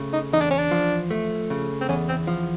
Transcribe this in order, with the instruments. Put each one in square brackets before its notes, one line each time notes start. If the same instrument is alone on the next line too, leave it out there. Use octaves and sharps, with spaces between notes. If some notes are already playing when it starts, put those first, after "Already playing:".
Already playing: [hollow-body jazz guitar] C#3 A3
[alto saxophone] D#4
[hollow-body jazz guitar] E2 [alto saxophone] D#4
[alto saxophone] D4
C#4
D4
[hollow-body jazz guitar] F3
A3
C#3
[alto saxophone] C4
[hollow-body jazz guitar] E2 [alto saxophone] C#4
[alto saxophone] C4
[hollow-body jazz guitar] F3